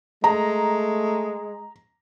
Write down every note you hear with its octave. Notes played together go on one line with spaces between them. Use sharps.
G#3 A3 A#5